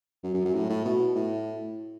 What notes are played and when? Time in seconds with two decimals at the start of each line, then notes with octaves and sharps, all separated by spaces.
0.24 F#2
0.34 F#2
0.45 F#2
0.54 A2
0.69 A2
0.85 B2
1.15 A2